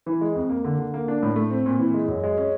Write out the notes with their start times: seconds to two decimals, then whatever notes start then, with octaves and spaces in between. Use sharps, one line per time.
0.06 E3
0.21 G#3
0.35 F2
0.49 A#3
0.64 D3
0.78 D3
0.94 A#3
1.08 D4
1.23 A2
1.36 A3
1.50 C4
1.66 A#2
1.79 E3
1.94 G#3
2.08 F#2
2.24 G#3
2.38 C#4